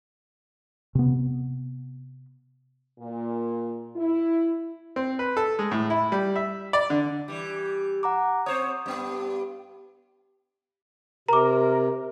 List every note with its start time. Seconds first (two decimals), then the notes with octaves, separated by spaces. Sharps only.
0.95 C3 B3
2.99 A#2
3.95 E4
4.96 C4
5.19 B4
5.37 A4
5.59 G#3
5.71 A2
5.90 E4
6.12 G3
6.36 E5
6.73 D5
6.90 D3
7.28 E3 G3
8.03 F#5 A#5 D6
8.46 C4 C5 C#5 D#6
8.86 G2 B3
11.29 C3 A#4 A#5 D6